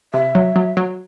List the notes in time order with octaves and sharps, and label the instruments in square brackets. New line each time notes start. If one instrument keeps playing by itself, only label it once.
[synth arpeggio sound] C3 [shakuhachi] E5
[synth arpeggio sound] F#3
F#3
F#3